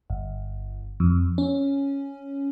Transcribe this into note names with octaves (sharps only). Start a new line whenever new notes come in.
G1
F2
C#4